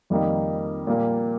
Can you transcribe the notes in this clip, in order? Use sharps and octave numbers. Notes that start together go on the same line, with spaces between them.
F2 D#3 G3 A#3 D#4
A#2 G3 A#3